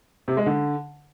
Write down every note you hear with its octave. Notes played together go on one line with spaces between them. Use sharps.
C3
G#3
D3